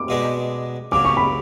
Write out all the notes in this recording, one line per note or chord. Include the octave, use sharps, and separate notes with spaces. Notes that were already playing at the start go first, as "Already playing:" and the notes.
Already playing: D6
B2 G#3 B3 D4
C#2 C#3 F#3 D6
C#6
B5